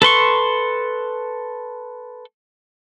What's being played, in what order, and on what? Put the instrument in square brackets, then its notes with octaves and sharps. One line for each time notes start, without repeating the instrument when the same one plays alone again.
[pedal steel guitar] A4 B4 C6 C#6